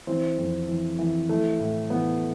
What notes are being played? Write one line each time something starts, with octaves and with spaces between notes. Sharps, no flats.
E3 C4
F2
E3
E3
E3 A3
A2
E3 B3